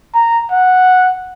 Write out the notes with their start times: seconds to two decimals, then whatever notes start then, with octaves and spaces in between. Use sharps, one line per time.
0.15 A#5
0.51 F#5